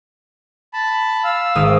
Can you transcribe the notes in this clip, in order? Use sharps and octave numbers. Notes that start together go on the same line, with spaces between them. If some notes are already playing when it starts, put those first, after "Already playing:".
A5 B5
F5 E6
G#1 D#6